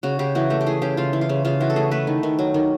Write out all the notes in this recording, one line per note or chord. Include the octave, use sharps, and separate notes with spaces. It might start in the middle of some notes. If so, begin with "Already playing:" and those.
C#3 F#4
C#3 G4
E3 F#4
A3 G4
G4
E3 G#4
C#3 G4
C#3 F4
E3
F4
C#3
C#3 F4
E3 F#4
A4
A3 G#4
A3 B4
D#3
D#3
F#3
D#3